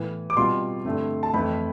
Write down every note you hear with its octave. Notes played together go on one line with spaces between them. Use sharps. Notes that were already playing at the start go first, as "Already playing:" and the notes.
Already playing: A2 E3 B3
D6
B2 G3 C4 F4 C6
G2 D3 A3 C4
A5
F2 E3 A3 C4 B5